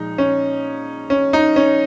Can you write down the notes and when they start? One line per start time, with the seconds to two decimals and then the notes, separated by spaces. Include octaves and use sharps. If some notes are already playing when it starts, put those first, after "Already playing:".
Already playing: A#2 F3 G#3 D#4
0.18 C#4
1.10 C#4
1.33 D#4
1.56 C#4